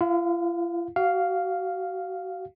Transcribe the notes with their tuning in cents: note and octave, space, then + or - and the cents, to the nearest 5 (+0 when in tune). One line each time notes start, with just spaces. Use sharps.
F4 -45 F5 +20
F#4 +30 F5 +0